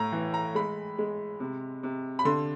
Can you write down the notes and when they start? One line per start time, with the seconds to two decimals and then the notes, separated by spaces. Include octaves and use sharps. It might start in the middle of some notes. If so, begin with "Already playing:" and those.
Already playing: A2 A#5
0.12 E3
0.34 A#5
0.55 G#3 B5
0.99 G#3
1.40 C3
1.83 C3
2.19 B5
2.25 D3 C6